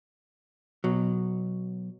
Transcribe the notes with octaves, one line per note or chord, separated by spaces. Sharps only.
B2 F#3